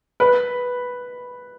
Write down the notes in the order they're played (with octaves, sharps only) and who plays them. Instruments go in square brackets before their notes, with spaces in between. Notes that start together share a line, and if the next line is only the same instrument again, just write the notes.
[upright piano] B4